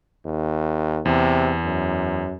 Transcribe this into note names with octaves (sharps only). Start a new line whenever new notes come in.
D#2
E2 C3
F#2